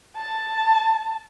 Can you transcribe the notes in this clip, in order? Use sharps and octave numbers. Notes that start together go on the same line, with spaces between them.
A5